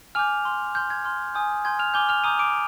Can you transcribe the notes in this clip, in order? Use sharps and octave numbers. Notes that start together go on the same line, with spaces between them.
G#5 D6 F6 G6 F7
C6 F6
C6 F6 G6
G#6
C6 F6
G#5 D#6 G6
G#5 C6 G6 G#6
F6 F7
G#5 D6 F6 G6 G7
F6 F7
A#5 D6 D#6 G6 D#7
D6 D7